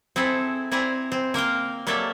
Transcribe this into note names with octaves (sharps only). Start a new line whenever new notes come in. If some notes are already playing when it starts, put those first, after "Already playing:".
C4 E4 G#4 A4
C4 E4 D5 G#5 A#5
C4
A#3 A#4 F5 G5
F#3 A#3 G4 A4 D5 E5